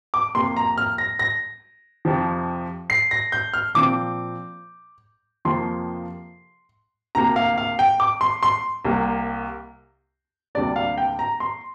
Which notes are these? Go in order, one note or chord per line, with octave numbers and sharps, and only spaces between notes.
D6
F2 C3 A#3 C6
A#5
F6
A#6
A#6
F2 C3 F3
C7
A#6
G6
F6
A#2 F3 C4 D6
F2 C3 F3 A#3 C6
D2 C3 A#3 A#5
F5
F5
G5
D6
C6
C6
C2 C3 A#3
D2 C3 G3 A#3 D5
F5
G5
A#5
C6